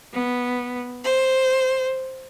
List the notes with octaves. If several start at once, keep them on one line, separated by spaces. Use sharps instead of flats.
B3
C5